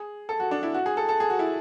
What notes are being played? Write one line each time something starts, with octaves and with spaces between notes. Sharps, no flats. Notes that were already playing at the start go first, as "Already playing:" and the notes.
Already playing: G#4
A4
F#4
D4
E4
F#4
G#4
A4
A4
G#4
F#4
E4